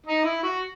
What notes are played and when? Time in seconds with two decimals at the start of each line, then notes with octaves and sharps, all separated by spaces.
0.06 D#4
0.24 E4
0.43 F#4